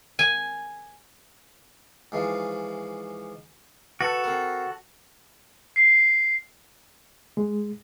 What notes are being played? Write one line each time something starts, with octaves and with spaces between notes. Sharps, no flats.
G#5
G#2 E3 F3
F#4 A4 B4
C4 A#4
C7
G#3